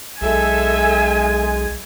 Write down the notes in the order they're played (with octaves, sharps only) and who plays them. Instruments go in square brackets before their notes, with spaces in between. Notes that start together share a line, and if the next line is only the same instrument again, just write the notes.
[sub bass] B1 [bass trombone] G#3 [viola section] A4 E5 [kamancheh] G#5